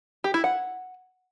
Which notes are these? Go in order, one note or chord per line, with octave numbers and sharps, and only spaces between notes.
G4
E4
F#5